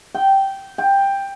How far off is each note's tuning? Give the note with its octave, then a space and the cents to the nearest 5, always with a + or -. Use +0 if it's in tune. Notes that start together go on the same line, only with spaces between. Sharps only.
G5 -10
G5 +10